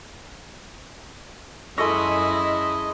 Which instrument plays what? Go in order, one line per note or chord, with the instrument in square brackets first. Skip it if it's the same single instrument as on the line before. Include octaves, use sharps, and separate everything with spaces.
[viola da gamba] F#2 E4 [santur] G#3 A4 C#6 [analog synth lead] D#5